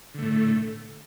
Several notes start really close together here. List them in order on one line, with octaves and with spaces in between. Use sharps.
D3 A3 A2